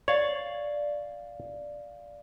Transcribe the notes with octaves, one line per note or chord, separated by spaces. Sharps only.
C#5 D5 F5